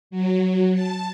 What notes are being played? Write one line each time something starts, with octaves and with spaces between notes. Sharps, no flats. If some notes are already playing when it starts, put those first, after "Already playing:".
F#3
A5